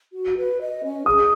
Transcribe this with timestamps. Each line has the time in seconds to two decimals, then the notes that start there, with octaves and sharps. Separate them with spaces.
0.13 F#4
0.36 B4
0.60 D#5
0.83 C#4
1.06 G#4 D#6